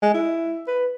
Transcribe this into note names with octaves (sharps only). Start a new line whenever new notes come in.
G#3
E4
B4